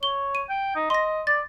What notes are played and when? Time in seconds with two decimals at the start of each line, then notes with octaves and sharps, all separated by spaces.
0.03 C#5 G7
0.35 D#7
0.49 G5
0.75 D#4
0.90 D#5 C6 A#6
1.27 D5 A6